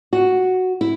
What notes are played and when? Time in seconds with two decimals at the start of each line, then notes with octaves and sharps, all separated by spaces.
0.13 F#4
0.81 E4